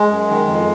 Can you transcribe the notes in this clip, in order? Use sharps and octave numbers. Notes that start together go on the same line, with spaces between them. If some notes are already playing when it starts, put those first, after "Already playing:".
Already playing: G#3
F#2
D#3
F2